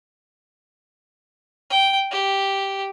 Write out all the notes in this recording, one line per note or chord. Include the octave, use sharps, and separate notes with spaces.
G5
G4